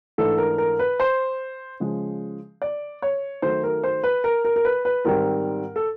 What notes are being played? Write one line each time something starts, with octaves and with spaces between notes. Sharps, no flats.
G#2 E3 A3 D4 A4
A#4
A#4
B4
C5
C#3 F3 G#3
D5
C#5
D#3 F#3 A3 C5
A#4
C5
B4
A#4
A#4
A#4
B4
B4
G#2 D#3 G3 C4 A#4
A4